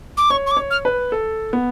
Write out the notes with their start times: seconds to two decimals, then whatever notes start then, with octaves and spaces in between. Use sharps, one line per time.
0.17 D6
0.30 C#5 C#6
0.46 C#6
0.51 D6
0.57 C#5
0.71 F6
0.85 B4
1.12 A4
1.53 B3